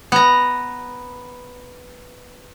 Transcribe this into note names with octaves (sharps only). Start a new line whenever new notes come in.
B3 A#5